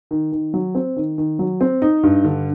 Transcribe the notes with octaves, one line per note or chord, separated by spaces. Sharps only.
D#3
D#3
F#3
C4
D#3
D#3
F#3
C4
D#4
G2
D3